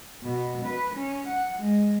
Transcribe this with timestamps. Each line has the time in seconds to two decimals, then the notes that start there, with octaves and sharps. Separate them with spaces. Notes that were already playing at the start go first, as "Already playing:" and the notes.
0.22 B2
0.64 B4
0.94 C#4
1.26 F#5
1.59 G#3